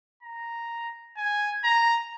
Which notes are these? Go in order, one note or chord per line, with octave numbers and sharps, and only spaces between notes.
A#5
G#5
A#5